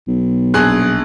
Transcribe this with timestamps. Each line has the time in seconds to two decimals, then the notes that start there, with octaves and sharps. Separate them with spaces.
0.08 B1
0.54 A#1 G#4 F#6